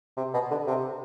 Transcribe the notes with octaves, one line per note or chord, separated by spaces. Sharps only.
C3
B2
D3
C3